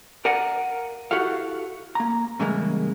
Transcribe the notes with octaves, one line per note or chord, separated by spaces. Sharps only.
A#4 D5 F5 F#5 G#5 A#5
E4 F#4 G4 A4 F5
A#3 A#5
A2 C#3 E3 G3 G#3 A#3